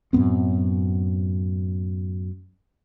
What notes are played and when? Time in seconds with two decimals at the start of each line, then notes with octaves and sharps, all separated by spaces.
0.13 F#2 A2 B3 C4